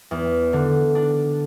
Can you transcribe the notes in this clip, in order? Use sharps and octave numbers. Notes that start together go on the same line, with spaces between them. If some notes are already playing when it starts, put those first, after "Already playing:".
E2
D3
D4